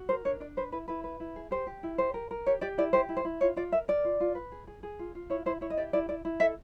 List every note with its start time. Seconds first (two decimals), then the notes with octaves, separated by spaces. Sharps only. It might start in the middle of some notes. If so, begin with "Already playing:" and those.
Already playing: F#4
0.09 A#4 C5
0.25 D4 C#5
0.40 D4 D5
0.57 B4 C5
0.72 E4 B4
0.88 E4 B4
1.04 B4
1.20 E4
1.36 G#4
1.51 G4 C5
1.67 G4
1.83 E4
1.98 G4 C5
2.14 A#4
2.31 A#4
2.46 G4 C#5
2.61 G4 D5
2.78 E4 D5
2.93 G4 C5
3.09 E4
3.17 C5
3.25 E4
3.41 F4 C#5
3.56 F4 D5
3.72 A#4 E5
3.88 A#4 D5
4.05 F4
4.20 F4
4.35 B4
4.52 G#4
4.67 G#4
4.83 G#4
4.99 F4
5.15 F4
5.30 E4 C#5
5.46 E4 C5
5.61 E4 C#5
5.70 D#5
5.77 G4 D5
5.93 E4 D5
6.09 E4 D5
6.25 E4
6.40 A4 E5